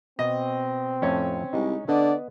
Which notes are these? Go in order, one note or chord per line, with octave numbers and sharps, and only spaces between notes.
B2 C4 D#5
F2 A2 A3 C#4 C#5
C2 G#3 D#4
D3 B3 D5 D#5